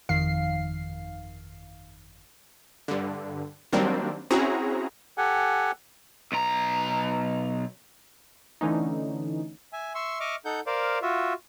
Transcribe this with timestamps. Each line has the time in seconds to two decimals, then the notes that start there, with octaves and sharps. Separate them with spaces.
0.09 G1 F2 D#3 F5 C7
2.88 G2 D3
3.73 D#3 F#3 G3 A#3 C4 D4
4.31 C4 C#4 E4 F#4 G#4 A#5
5.18 G4 A4 F#5 G#5
6.32 B1 A#5
8.61 D3 E3 A3 C#4 D#4
9.73 E5 G#5
9.95 E5 C6 C#6 E6
10.20 D#5 E5 C#6 D6 F6
10.45 D#4 A4 F#5 G6
10.67 A#4 C5 D5 F5
11.02 F4 F#4 E5